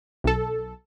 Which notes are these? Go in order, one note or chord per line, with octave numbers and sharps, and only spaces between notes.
B1 A4